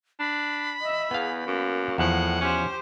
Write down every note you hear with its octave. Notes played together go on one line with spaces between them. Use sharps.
D4 B5
D#5 E5
E2 B3 G#4 F5
F#2 A#3
E2 A2 F3 F#5
C#4 G4 C5